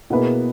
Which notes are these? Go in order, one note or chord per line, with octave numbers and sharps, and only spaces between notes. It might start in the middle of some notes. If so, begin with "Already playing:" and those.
B2 A#3 E4 G#4 B4